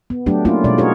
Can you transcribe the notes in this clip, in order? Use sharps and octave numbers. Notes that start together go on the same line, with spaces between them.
B3
F#3 A3 D4 G4
A3 A#3 C#4 D4 E4 F4
B2 G#3 D5
D#4 F#4 G#4 A#4 C#5